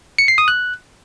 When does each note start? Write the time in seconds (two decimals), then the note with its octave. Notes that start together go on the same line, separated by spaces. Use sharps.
0.18 C#7
0.28 C7
0.38 D#6
0.48 F#6